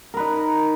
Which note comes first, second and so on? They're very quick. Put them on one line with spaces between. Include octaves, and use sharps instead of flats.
A#4 B4 D#4